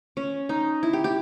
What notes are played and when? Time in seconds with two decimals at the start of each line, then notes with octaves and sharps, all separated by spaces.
0.17 C#4
0.49 D#4
0.83 E4
0.93 G4
1.04 G4